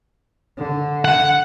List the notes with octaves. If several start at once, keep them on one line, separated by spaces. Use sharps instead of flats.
D3
F#5